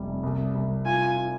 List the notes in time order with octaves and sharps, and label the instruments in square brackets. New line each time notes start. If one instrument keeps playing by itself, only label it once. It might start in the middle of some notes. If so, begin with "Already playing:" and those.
Already playing: [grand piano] F1 G3
C2
C2
[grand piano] F4 [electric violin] G#5
[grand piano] F4